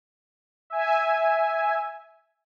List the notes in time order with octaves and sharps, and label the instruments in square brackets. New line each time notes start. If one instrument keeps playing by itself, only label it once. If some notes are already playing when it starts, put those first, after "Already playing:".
[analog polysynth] E5 G#5